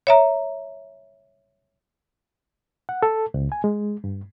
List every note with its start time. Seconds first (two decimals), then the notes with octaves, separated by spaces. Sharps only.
0.07 C#5 E5 A#5
2.89 F#5
3.03 A4
3.34 C#2
3.52 G#5
3.64 G#3
4.04 G2